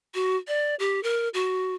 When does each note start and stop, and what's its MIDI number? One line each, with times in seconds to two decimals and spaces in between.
0.14 0.36 66
0.48 0.75 74
0.79 1.03 67
1.03 1.29 70
1.34 1.75 66